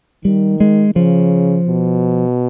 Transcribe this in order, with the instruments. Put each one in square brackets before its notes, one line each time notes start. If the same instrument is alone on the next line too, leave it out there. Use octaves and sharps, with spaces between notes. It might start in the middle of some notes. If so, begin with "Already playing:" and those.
[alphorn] D#3 [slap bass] G3
[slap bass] G#3
[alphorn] C#3 [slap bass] F3
[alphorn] B2